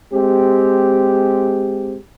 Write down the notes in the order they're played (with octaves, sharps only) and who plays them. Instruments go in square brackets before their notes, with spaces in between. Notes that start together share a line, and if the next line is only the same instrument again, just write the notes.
[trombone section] G#3 C4 G4